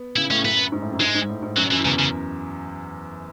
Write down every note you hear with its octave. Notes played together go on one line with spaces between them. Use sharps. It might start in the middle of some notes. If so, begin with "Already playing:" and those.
Already playing: B3
C#3 E4
A2 C#4
F#2 B3
G#2
A2
F#2
G#2 G#3
G#2
A2
G#2
F#2 F#3
F#2 E3
E2 C#3
C#3